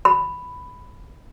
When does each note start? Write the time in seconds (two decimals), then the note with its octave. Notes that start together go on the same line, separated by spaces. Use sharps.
0.05 B5